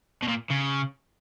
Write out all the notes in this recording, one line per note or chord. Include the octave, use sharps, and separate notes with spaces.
B2
A#2
C#3